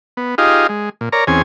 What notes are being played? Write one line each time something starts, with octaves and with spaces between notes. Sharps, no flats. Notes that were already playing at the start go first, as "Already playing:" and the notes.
B3
D#4 F4 G4 G#4 D#5 F5
G#3
A#2
A#4 C#5 D5 A#5
E2 C4 C#4 G#4 G#5